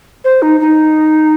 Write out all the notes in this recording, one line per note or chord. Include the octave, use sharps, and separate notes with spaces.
C5
D#4
D#4